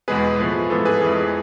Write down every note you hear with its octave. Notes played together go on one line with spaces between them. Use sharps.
E2 B2 G#3 B3 G#4 B4
A2 F3 B3
G#2 E3 B3 A4
G#4 B4
F2 E3 G#3